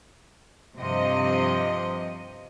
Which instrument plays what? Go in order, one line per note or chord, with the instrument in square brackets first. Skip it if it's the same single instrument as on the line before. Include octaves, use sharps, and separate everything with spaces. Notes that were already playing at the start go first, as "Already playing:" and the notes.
[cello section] G2 C3 F3 D#5